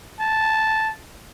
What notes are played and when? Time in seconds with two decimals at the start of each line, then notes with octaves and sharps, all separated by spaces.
0.20 A5